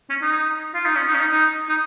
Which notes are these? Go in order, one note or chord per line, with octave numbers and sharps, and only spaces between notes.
C#4
D#4
F4
D#4
C#4
D#4
C#4
D#4
D#4
D#4